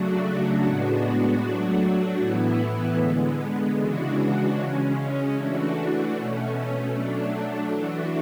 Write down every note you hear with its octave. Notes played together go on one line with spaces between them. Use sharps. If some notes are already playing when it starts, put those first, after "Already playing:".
Already playing: C#3 F#3 A3 D4 F#4
A2 G#3 B3 D4 F#4
F#3 A3 D4 F#4
A2 E3 B3 E4
D3 G#3 B3
C#3 E3 G#3 D4 F#4
C#3 G#3 C#4
E3 A3 D4 F#4
B2 A3 C#4
F#3 A3 D4
E3 A3 D4 F#4